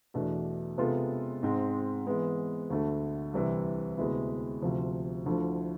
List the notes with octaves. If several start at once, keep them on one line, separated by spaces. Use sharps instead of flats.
E2 B2 A3 D4
C3 G#3 B3 F4 A4
G#2 G#3 C4
E3 G#3 B3
D2 D3 A3
C2 C3 E3
D2 C3 G#3 B3 E4
D2 C3 F3
D2 D3 F3 A3 E4